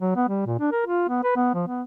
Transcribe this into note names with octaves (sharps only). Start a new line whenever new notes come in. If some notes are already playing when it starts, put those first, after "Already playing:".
F#3
B3
G3
A#2
D4
A#4
F4
B3
B4
B3
F3
B3